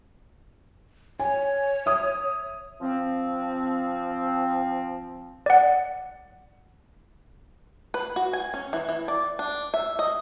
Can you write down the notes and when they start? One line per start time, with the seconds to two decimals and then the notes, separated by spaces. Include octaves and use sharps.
1.20 C#5 G#5
1.86 E5 D#6
2.81 F3 C4
5.46 D5 F#5
7.94 B4
8.16 F#4
8.33 G#5
8.54 C#4
8.73 E3
8.89 E3
9.08 D5
9.39 D4
9.74 E5
9.99 D#5